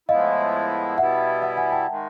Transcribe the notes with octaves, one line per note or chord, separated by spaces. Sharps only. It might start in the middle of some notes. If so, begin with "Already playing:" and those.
A2 F3 G#3 B3 E4 D#5 F5
B2 G3 B3 E4 E5 F#5
E5 F#5
F#5 G#5
G5 A5
D#3 G#3